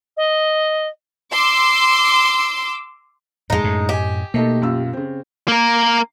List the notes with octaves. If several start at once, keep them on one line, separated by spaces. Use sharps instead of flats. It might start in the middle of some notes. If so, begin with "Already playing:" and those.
D#5
C6 D6 E6
F2 A2 G#3 A3 D#4
F#2 A2
G4 D#5 G#5
B2 A3 A#3 D#4 A4
F#2 F4 E6
C#3 C4
A#3 A#4